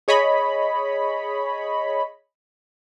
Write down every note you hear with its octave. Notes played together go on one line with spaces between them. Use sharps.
G#4 C#5 D#5 B5